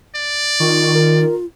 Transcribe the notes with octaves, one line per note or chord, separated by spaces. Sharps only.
D5
D#3 F4 C#6
A#4